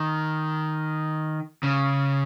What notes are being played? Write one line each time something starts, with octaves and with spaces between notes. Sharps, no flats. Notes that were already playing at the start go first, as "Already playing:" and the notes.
Already playing: D#3
C#3